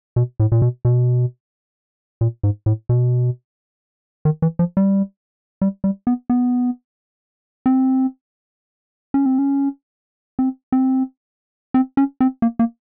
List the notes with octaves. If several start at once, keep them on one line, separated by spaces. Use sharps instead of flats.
B2
A2
A#2
B2
B2
A#2
G#2
A2
B2
D#3
E3
F3
G3
G3
G3
B3
B3
C4
C#4
C4
C#4
C4
C4
C4
C#4
C4
A#3
A#3